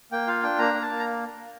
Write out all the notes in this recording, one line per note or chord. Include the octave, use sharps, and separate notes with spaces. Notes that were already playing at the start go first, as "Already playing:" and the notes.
A#3 G5
F4 F5
D4 G5
A#3 A#5
A#3
A5
A#3
A#5